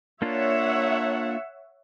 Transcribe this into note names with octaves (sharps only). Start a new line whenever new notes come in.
A#3 D4 F4 C#5 E5 F#5